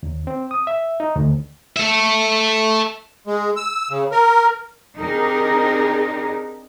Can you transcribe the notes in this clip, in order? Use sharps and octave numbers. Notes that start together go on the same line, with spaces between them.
D#2
C4
D#6
E5
D#4
D2
A4 E5
G#3
E6
C#3
A#4
C4 D4 D#4 G4 G#4 A#4